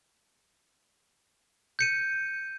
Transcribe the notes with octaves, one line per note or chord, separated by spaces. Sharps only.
G6 C#7 D#7